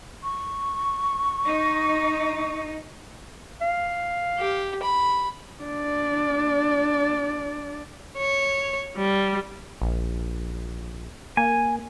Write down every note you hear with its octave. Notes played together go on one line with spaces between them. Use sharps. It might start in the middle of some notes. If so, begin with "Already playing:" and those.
C#6
D#4
F5
G4
B5
D4 D5
C#5
G3
A#1
A#3 G#5